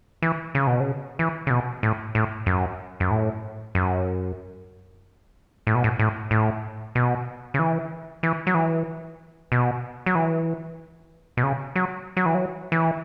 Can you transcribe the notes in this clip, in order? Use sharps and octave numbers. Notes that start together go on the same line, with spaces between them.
E3
C#3
B2
C#3
E3
C#3
B2
A2
A2
F#2
F#2
A2
F#2
A2
B2
A2
A2
A2
B2
C#3
E3
E3
F#3
E3
B2
F#3
E3
B2
C#3
F#3
F#3
E3
F#3
E3